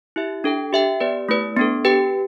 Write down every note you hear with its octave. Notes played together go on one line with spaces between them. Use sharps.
E4 G4 E5
D4 A4 G5
G4 E5 G5
B3 G4 B4 D5
A3 E4 B4
B3 D4 A4
G4 B4 G5